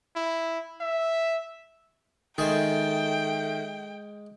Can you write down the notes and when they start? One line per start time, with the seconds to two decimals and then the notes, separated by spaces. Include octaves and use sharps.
0.16 E4
0.81 E5
2.38 D#3 G#3 G#4 A4 E5 G5